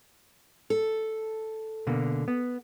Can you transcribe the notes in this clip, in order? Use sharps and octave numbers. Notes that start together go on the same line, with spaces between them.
A4
B2 D3 A#3
B3